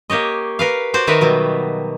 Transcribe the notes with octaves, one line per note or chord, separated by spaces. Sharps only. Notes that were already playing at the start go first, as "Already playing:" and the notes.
A#3 G4 C#5 D#5
A#4 B4 F5
F#4 C5 D5
D#3 F#4 A#4 B4 E5
B2 F#3 G3